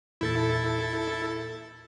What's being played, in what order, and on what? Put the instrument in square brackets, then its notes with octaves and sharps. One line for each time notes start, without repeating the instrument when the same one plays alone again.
[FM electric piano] E2 A#2 G6 [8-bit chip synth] E4 A4 A6